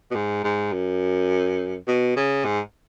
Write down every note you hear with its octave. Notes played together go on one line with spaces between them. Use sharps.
B2
G#2
G#2
F#2
B2
C#3
G#2